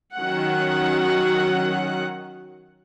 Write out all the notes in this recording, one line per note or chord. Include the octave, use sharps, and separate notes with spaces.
D#3 F#3 C#4 F#5